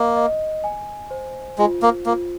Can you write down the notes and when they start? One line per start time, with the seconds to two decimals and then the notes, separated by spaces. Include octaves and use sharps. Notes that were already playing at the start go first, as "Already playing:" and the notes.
Already playing: A#3 D#5
0.17 D#5
0.64 G#5
1.11 C5
1.58 G#3 F4
1.82 A#3
2.06 A#3 F4